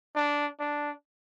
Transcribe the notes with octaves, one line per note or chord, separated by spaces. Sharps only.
D4
D4